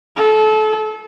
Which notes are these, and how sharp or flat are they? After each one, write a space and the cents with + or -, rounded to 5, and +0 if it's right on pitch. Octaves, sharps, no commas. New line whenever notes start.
A4 -30